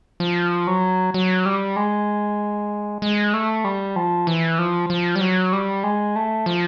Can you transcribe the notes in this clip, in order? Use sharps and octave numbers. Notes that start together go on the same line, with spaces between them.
F3
F#3
F#3
G3
G#3
G#3
A3
G3
F3
E3
F3
F3
G3
F#3
G3
G#3
A3
F3